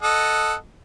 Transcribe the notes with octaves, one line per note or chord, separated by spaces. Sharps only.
A4 D#5 F#5